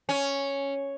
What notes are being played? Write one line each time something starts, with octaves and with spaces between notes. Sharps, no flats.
C#4